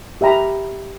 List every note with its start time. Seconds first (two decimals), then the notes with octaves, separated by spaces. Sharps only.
0.21 G4 E5 G5 A#5 B5